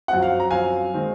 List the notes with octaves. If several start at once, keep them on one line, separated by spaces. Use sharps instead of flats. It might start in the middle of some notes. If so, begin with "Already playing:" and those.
F#2 F3 C4 F#5
F5
A#5
F#2 F3 C4 F5 G#5
D#3 G#3 C4